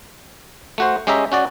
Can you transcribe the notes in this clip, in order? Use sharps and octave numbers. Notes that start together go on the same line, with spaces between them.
A3 F#4 C5
G#3 C#4 G4 D#5 E5 A#5
C#4 F#4 D5